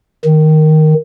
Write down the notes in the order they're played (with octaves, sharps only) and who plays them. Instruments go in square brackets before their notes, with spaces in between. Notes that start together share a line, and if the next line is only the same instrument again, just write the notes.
[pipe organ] D#3